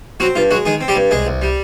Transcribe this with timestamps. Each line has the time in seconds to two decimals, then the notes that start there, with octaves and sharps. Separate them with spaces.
0.20 F#3 C4 F#4
0.35 G2 F4
0.51 F#3 G#3 F#4
0.65 D#3 G#3 G#4
0.81 C4
0.88 G3 G4
0.96 G2
1.11 C2 G#3 G#4
1.27 C2
1.42 G3